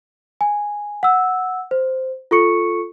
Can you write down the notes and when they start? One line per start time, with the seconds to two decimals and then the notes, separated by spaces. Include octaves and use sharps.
0.41 G#5
1.03 F#5 E6
1.71 C5
2.31 F4 A4 C#6 C#7